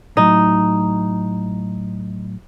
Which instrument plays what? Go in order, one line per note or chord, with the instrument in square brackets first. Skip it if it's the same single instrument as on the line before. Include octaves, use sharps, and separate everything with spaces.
[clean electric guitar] A2 F#3 [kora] D#4